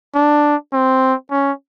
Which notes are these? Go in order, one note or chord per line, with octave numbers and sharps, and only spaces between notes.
D4
C4
C#4